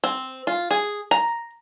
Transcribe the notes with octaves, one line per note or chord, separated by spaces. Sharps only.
C4
F4
G#4
A#5